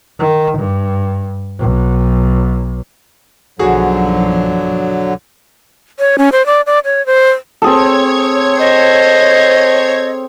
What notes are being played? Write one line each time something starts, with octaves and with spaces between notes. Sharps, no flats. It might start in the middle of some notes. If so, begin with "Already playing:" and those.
D#3
G2
B1
B1 G2 D3 F3 F#3 F#4 G#4
C#5
C#4
C5
D5
D5
C#5
C5
C4 G#4 A4 C#5 G#6
C5 D#5